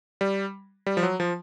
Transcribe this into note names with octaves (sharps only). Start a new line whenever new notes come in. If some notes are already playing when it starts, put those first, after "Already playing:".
G3
G3
F3
F#3
F3